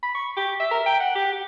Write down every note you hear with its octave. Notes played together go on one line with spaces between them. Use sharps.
B5
C#6
G4
E5
A#4
G5
F#5
G4
G4